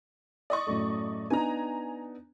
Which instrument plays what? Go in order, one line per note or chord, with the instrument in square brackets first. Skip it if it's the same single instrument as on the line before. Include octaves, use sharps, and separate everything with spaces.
[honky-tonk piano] D5 D#5 C#6
[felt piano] F#2 A2 A3
[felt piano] B3 D4 D#4 [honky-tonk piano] G#5 A#5